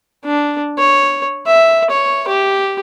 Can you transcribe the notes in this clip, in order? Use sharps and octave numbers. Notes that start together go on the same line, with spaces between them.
D4
C#5
E5
C#5
G4